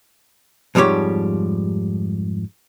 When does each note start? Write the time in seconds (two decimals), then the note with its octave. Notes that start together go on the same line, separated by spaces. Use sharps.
0.75 F2 G#2 F3 G3 G4 C#5